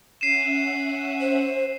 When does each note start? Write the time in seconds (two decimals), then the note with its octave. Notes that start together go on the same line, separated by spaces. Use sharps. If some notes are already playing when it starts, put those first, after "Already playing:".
0.21 C#4 E5 F#5 C7 D#7 E7
1.21 C5